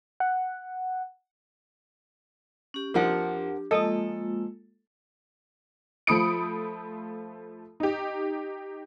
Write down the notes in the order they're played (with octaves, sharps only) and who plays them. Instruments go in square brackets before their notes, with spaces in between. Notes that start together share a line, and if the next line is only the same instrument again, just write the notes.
[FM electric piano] F#5
[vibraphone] C#4 G4
[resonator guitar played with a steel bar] F2 A#4 F#5 [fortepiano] F3 A#3 [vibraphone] D4 G4
[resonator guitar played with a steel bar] F3 D#5 [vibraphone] G#3 A#3 F4 [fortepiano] A4
[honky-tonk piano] F3 A3 B5 D#6 C#7 D7
D#4 G4